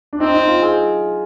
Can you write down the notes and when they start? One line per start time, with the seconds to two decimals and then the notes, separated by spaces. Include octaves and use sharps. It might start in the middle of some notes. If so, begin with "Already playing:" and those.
0.13 D4
0.20 C4 D#4
0.34 D#4
0.48 F4
0.62 G#4